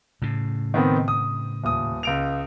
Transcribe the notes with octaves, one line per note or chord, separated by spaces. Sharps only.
A2 C#3
D#3 B3 C4
D#6
D#1 D#6
C#2 D7 F7